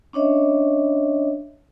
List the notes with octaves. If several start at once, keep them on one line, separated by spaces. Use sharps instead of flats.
C#4 D4 C#5 D#5 E5